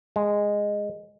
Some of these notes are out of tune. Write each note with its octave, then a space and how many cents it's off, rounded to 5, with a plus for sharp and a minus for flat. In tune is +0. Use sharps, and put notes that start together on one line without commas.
G#3 -10